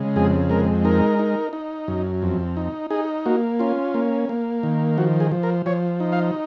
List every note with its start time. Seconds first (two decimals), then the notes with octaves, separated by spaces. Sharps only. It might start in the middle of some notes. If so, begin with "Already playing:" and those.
Already playing: C#3 G#3
0.16 F2 G#4
0.50 G#3 A#4
0.85 D#4 A#4
1.19 D#4
1.53 D#4
1.88 F#2
2.22 F2
2.57 D#4
2.90 D#4 G#4
3.26 A#3 F#4
3.59 C#4 F4
3.94 A#3
4.29 A#3
4.63 D#3
4.97 F3 F#4
5.20 G#4
5.32 F3
5.43 A#4
5.66 F3 C#5
6.00 D#4
6.12 F5